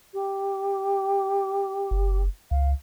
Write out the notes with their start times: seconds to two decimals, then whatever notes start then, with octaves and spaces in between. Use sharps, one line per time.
0.14 G4
1.91 F#1
2.51 C#2 F5